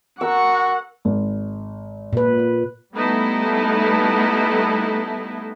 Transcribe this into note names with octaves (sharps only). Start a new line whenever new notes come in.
F#4 A#4 F#5 C#6 E6
G#1
A#2 B4
G3 A3 B3 D#4 E4 A4